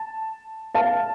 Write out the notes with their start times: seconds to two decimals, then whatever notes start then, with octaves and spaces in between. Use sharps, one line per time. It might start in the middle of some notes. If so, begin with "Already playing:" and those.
Already playing: A5
0.75 F5 A5